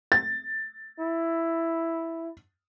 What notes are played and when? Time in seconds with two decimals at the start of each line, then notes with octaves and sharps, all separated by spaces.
0.12 A6
0.99 E4